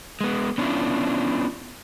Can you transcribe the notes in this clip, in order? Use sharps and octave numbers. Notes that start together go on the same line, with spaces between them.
G#3 B3
B3 C#4 D4 E4 F4